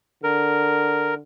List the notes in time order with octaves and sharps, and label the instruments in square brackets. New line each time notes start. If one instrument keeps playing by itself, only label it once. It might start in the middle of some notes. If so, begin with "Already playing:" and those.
[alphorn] D3 [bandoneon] A#4